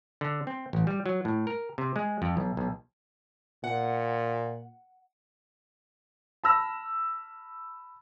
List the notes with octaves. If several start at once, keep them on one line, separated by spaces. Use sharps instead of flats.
D3
C4
A1
G3
F#3
A2
A#4
C3
G#3
F2
B1
B1
A#2 F#5
A5 B5 E6 F6 A#6